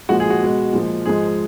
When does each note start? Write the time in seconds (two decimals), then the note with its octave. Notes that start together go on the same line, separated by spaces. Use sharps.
0.09 A#2 F3 G#3 F#4
0.20 G#4
0.30 F#4
0.42 B2 G#3
0.73 A#2 F3 G#3
1.05 G#2 F3 G#3 G#4